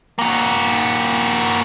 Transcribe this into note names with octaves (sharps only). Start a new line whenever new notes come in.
A#3 F#4